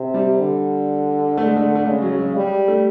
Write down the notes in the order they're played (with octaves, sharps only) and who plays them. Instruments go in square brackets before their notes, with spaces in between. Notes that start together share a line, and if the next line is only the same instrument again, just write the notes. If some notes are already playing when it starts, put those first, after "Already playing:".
Already playing: [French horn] C3
[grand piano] G3
[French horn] D3
[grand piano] A3
G#3
A3
A3
[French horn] C#3 [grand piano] G#3
[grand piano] F#3
G#3
[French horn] G3 [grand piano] G#3
[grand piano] A3